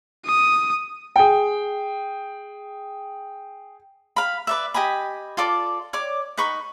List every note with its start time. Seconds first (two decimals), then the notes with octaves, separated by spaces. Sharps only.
0.26 D#6
1.16 G#4 G5
4.16 F5 B5
4.47 B4 D5 E5
4.74 G4 D#5 G#5 B5
5.37 F4 A4 D5 D6
5.93 C#5 D5 D6
6.37 D#4 B4 B5 C#6